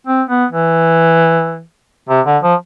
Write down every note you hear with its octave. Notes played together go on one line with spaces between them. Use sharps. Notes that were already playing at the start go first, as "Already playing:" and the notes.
C4
B3
E3
C3
D3
F3